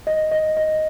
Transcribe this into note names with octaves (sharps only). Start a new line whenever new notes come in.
D#5
D#5
D#5